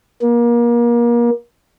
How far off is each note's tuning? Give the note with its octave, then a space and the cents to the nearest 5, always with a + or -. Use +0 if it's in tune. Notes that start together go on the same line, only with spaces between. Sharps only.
A#3 +30